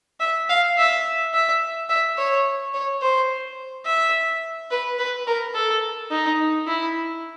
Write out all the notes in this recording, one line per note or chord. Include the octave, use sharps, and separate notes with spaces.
E5
F5
E5
E5
E5
C#5
C#5
C5
E5
B4
B4
A#4
A4
D#4
E4